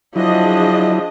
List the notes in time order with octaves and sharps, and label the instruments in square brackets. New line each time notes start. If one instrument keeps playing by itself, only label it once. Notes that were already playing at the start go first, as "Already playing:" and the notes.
[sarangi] F3 [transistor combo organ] F#3 E4 [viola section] D4 G#4 D#5